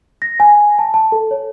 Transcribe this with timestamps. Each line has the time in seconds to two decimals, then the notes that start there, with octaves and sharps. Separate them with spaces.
0.22 A#6
0.40 G#5
0.79 A5
0.94 A5
1.12 A4
1.31 C#5